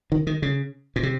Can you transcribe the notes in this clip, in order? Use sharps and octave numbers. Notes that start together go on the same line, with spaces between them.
D#3
D#3
C#3
A#2
C3